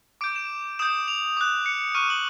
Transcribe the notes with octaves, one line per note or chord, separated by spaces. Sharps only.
D6 G6 D7
E7
D#6 G6 E7
F7
D6 F#6
C#7
C#7
C#6 F6 D#7
F#7